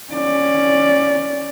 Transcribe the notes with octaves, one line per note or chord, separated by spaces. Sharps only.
C#4 D5